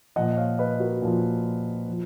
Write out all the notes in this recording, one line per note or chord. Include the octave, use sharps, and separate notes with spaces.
A#2 F3 D#5 F#5
C#5 F5
B4 D#5
F#4 A#4
A#2 F3
F3